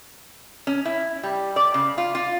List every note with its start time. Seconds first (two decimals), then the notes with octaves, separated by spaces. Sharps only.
0.67 C#4
0.86 E4
1.23 G3
1.56 D5
1.74 C#3
1.98 F4
2.15 F4